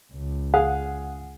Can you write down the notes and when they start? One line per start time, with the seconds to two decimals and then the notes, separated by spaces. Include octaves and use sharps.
0.13 C#2
0.54 G#4 F5 F#5